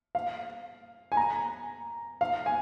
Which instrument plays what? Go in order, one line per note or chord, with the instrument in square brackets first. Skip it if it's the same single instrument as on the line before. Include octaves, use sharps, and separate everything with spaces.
[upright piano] F5
G#5
A#5
F5
G#5